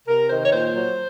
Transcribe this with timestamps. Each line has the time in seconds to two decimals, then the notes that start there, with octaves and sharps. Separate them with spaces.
0.08 C3 A#4
0.30 D#3 C5
0.45 C#5
0.53 A#2 C5
0.75 F#3